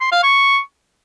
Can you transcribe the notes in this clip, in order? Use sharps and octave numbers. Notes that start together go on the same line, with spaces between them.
C6
F5
C#6